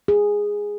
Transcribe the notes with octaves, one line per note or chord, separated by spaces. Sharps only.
G#4